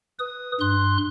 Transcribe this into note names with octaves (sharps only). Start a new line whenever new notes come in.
B4 D#6
G2 C6 F#6